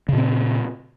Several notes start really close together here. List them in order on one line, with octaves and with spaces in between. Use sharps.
C#3 A#2 C4